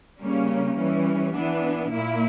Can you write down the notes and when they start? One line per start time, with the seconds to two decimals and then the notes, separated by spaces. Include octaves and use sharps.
0.21 C#3 G3 A#3 C#4
0.77 E3 G3 C#4
1.35 E3 B3 D4
1.91 A#2 A#3 E4